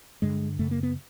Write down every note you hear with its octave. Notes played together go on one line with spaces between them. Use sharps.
G2 D3 G#3
F#2 C#3 A3
A#3
B3